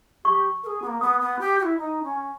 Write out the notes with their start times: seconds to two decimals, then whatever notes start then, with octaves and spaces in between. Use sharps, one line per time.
0.24 G4 C#6
0.63 A#4
0.66 G#4
0.82 B3
0.87 A#3
1.01 B3 D#6
1.20 B3
1.40 G4
1.58 G4
1.63 E4
1.78 D#4
2.03 C#4